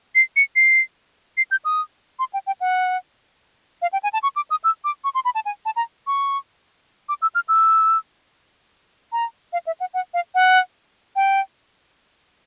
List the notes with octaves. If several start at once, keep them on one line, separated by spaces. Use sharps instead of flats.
C7
C#7
C7
C7
G6
D#6
C6
G5
G5
F#5
F5
G5
G#5
A5
C#6
D6
D#6
E6
D6
C#6
C6
B5
A5
G#5
A5
A#5
C#6
D6
E6
F6
E6
A#5
F5
E5
F#5
F#5
F5
F#5
G5